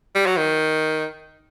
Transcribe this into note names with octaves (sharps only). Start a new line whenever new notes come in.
G3
F#3
D#3